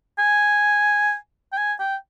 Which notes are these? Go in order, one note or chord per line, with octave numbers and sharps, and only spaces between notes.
G#5
G5
G#5
G5